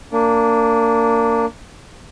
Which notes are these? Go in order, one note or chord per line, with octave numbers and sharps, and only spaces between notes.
A#3 D4